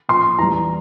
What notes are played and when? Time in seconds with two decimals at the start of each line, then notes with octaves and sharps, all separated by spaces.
0.09 A#2 F3 C6
0.38 E2 E3 G3 A#5